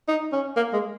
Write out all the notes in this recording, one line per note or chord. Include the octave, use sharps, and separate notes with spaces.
D#4
C#4
A#3
G#3